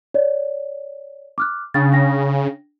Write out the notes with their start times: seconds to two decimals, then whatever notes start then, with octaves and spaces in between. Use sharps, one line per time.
0.14 C#5 D5
1.38 D6 F6 F#6
1.74 C#3 D4 G5 A6
1.92 D4 G5 A#6